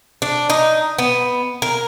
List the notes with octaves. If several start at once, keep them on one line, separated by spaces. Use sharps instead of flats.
D4
D#4
B3
A#4